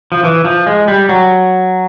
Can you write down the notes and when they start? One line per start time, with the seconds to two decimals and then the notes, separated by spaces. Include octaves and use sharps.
0.12 F3
0.23 E3
0.45 F3
0.67 G#3
0.88 G3
1.09 F#3